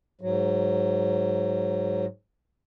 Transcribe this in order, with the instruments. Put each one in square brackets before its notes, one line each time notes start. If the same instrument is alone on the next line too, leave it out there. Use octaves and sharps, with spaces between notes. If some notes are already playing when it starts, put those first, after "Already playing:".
[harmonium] G#2 F#3